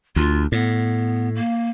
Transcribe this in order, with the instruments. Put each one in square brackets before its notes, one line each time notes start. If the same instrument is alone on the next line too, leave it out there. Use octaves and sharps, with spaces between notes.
[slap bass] D2 [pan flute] F4
[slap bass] A2 [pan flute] B3
[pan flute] A#3